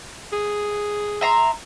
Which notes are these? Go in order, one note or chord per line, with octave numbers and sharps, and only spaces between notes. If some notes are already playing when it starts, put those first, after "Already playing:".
G#4
E5 A#5 C6